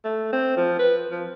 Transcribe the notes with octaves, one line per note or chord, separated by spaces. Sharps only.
A3
C4
F3
B4
F3